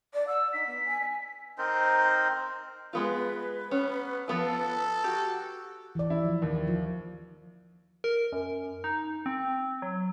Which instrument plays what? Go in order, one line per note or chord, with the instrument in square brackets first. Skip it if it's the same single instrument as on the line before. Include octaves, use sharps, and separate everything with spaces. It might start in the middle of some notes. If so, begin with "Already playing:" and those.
[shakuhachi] D5
[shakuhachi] F#5 [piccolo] E6
[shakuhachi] D#4 [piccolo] B6
[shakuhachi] B3
G#5
[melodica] C4 D#4 A#4 C5
[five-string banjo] G#3 B3 F4 [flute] B4
[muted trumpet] B3 [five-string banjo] C#4
[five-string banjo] F3 B3 F4 [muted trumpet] A4
[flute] F#4 [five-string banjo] G4
[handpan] E3 D5
[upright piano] E4
[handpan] F3
[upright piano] D#2
[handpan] F3 F4
[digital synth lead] A#4
F#2
D#4
C4
F#3